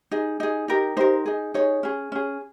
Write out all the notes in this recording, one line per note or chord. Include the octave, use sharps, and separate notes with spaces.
D#4 G#4
D#4 G#4
D#4 G4 A#4
D#4 G4 A#4 C5
D#4 G#4
D#4 G#4 C#5
C#4 G#4
C#4 G#4